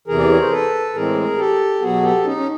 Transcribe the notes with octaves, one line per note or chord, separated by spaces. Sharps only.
E2 C3 E3 G#4 A#4
D5
C#5
C5
A4 B4
A2 E3 G#3 C4 G#4 A#4
G4 A4
B2 F#3 B3 F#4 G#4
G4 A4
C#4 D#4
C#4